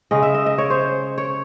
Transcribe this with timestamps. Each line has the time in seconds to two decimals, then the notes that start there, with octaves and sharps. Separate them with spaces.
0.11 C#3 G#3 D#5
0.22 E5
0.34 D#5
0.46 D#5
0.58 C#5
0.70 C5
1.18 C#5